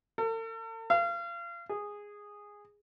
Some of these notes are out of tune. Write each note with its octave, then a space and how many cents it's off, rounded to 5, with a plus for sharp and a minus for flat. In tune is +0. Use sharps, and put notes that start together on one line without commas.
A4 +45
F5 -30
G#4 -10